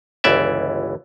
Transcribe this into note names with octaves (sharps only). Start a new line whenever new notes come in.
G1 C#2 E3 D5 E5